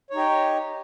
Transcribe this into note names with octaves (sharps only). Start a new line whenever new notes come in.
D#4 G4 C#5